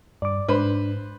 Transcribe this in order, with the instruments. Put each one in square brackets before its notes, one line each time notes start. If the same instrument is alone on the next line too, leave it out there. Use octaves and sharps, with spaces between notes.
[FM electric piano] G2 [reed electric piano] D5 D6
[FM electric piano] G#2 [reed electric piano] D4 [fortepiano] B4 C5